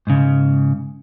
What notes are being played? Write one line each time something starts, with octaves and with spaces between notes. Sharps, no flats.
G#2 C#3